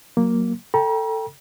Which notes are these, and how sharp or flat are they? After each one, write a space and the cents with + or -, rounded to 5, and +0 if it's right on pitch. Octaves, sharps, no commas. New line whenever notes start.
F#3 +0 A#3 +0
A4 +15 G5 +0 A#5 +45